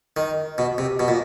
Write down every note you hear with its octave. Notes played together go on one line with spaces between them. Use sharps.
D#3
B2
C3
B2
A#2